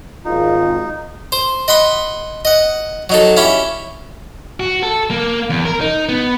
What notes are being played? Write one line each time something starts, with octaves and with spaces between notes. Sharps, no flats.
G#1 D#4 F4
C5
D#5 F#5 B5 C6
D#5 F#5
F#3 D#4 A4
C#4 E4 G4
F#4
A4
A#3
E2
A#4
D#4
B3